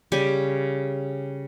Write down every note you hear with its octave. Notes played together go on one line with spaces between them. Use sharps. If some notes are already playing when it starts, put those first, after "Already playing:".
C#3 G3 G4 G#5